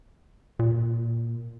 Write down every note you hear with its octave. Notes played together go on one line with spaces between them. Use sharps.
A#2